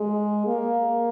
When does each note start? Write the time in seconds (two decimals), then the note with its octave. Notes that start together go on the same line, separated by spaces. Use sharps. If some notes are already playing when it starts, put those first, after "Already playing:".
Already playing: G#3
0.47 A#3